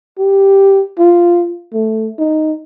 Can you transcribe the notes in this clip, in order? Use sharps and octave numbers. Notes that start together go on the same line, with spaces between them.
G4
F4
A3
D#4